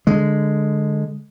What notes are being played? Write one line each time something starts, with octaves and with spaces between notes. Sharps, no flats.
D3 G#3